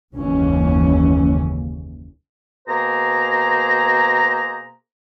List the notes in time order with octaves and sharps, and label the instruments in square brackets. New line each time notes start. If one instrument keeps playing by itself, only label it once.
[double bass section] F#1 D#2 G#2 C#3 E3 C#4
[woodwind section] B2 A#3 G#4 C5 A#5